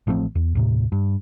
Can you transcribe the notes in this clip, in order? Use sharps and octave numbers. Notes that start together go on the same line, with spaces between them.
A1 F3 A3 C4
E2
D#2 A2 C3
G2